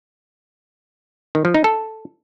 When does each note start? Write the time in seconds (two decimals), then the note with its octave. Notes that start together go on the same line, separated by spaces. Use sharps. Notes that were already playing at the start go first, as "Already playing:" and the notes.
1.35 D#3
1.45 F3
1.54 D#4
1.64 A4